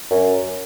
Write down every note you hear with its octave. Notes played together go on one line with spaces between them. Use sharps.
F#2